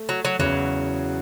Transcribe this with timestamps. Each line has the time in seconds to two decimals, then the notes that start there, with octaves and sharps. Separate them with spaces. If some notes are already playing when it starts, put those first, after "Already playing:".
Already playing: A3
0.09 F#3
0.25 F#3
0.39 E2 C#3 E3 F#3